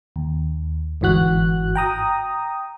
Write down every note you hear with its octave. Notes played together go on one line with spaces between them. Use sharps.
D#2
G1 G#2 E3 F#4 F#6
G5 A#5 D#6